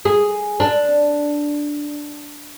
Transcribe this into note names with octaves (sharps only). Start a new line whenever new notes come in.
G#4
D4